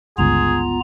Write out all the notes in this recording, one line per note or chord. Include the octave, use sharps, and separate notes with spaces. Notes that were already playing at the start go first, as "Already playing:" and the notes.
G1 C#2 G2 B3 F4 G#4 A#5